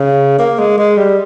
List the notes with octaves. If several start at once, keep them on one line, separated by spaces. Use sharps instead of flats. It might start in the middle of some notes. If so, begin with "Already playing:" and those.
Already playing: C#3
A#3
G#3
G#3
G3